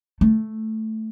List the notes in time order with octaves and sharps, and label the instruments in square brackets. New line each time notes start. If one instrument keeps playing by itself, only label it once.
[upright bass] A3